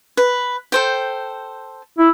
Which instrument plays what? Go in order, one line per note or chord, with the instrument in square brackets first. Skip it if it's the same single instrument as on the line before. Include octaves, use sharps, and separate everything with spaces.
[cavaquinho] B4
A4 C5 G5
[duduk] E4